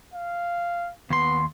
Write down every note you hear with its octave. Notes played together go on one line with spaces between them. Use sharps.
F5
D#2 B3 C6